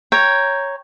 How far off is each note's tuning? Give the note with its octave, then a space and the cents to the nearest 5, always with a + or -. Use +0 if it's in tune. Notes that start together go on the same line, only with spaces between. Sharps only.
C#5 +0 G5 +0 A#5 +0